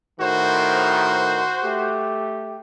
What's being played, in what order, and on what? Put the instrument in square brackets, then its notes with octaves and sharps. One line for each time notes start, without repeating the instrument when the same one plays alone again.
[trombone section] A2 D#3 [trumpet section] F#4 C5
[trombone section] A3 G4